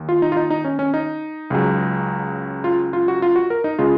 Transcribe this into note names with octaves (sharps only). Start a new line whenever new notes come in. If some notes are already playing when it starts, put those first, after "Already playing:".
Already playing: D#2
F4
D#4
F4
D#4
D#4
C#4
C#4
D#4
C#2 C#3 F#3
F4
F4
F#4
F4
F#4
A#4
D#4
C#3 G#3 F4